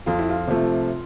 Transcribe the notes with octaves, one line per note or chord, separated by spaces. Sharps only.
F2 F4
E4
F4
C3 F3 A3